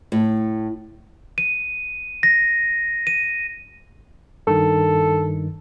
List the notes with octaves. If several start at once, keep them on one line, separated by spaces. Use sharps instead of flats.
A2
D#7
A#6
D#7
G2 D#3 A4